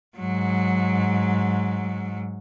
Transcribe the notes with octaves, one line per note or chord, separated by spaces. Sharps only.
G#2 F#3